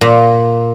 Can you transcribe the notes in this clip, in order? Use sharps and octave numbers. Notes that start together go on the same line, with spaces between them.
A#2